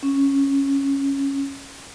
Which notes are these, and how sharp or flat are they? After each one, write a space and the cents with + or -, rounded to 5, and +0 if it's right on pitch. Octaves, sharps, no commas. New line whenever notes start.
C#4 -5